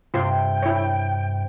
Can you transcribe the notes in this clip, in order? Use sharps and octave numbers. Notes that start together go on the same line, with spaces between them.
G2 C3 F4 C5 G5 C6
E4 C#5